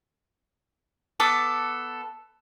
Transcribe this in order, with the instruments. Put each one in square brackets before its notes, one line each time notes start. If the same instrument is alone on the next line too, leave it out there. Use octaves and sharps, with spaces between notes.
[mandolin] B3 A4 A5 D6